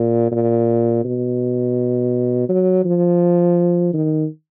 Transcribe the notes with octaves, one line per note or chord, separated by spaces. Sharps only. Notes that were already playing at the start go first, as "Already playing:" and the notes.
Already playing: A#2
A#2
B2
F#3
F3
D#3